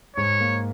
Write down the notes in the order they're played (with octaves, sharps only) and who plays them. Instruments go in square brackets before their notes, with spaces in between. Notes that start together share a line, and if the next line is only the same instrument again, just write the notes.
[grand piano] G#2 [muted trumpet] C#5
[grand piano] A#3